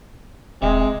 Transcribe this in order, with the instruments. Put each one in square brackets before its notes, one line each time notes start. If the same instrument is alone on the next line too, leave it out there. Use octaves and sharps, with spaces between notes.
[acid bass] D#1 [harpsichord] C3 [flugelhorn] G#3